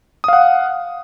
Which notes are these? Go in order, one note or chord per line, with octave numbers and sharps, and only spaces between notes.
F5 F#5 D#6